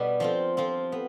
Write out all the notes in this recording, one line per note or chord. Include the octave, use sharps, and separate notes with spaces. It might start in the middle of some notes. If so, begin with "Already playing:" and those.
Already playing: B2 G3 B3
F3 C4 F4
F3 C4 F4
B3